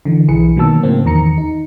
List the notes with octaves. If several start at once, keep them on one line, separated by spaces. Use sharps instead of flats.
D3 E3
B1 E3 G#4 B4 C#7
B2 D#3 F#3 A#3 A5 E6
A2 C#3 F#3 A#3 C4
E2 D#3 A#5 C#7
D#4